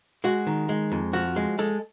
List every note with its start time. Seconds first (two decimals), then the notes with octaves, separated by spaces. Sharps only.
0.24 G#3 F#4
0.47 D#3
0.69 G#3
0.92 F2
1.13 F3 F#4
1.36 G#3
1.59 G#3 A4